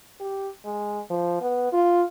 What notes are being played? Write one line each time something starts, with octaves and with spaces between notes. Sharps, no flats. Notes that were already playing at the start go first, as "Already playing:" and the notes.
G4
G#3
F3
B3
F4